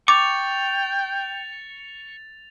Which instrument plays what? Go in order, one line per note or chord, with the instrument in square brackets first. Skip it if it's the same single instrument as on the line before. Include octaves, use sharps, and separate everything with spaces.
[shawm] G5 [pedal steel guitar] C#6 [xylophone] D6 [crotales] A6 F7